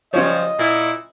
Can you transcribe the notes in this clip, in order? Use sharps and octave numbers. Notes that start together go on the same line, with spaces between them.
F3 G3 C#4 F4 C#5 D#5
A#2 E4